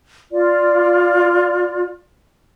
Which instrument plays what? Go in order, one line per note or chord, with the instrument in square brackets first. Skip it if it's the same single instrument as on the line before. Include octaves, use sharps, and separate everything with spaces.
[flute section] F4 D5